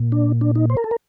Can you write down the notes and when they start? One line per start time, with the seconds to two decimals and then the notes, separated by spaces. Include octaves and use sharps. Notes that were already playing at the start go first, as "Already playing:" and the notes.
Already playing: A#2
0.12 D4
0.41 D4
0.55 D#4
0.70 C5
0.77 A#4
0.84 A4
0.91 A#4